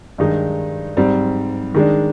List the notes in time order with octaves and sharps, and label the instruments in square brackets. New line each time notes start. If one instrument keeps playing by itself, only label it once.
[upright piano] G2 D#3 G#3 D#4
G#2 G3 C4
D#3 G#3 D4